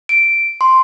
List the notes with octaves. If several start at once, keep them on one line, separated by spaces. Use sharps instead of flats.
D7
C6